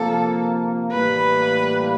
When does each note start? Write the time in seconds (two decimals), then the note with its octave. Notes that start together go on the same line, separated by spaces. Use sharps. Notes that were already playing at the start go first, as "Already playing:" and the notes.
Already playing: C3 F3 A#3 A4
0.92 A2 E3 G3 A#3 B4